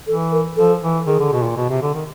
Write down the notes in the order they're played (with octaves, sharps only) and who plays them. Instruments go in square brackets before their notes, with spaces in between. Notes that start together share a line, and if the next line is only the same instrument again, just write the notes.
[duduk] E3 [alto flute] A4
[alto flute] A#4
[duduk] F3 [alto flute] A4
[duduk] E3
[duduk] D#3 [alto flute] G#4
[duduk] D3
B2
A#2
B2
C3
D3
D#3